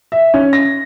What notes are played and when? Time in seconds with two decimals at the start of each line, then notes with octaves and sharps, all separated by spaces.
0.12 E5
0.34 C#4
0.53 A#6